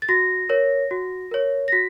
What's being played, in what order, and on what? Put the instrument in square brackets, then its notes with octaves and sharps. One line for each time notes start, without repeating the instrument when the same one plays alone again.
[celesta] A6
F#4 A#6
A#4 C#5
F#4
A#4 C#5
A#6
F#4 B6